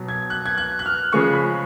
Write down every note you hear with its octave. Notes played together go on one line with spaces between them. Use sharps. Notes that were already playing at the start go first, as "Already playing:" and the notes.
Already playing: B2 F#3
G#6
F#6
G#6
F#6
F#6
F6
C#3 F3 G#3 C#6
B5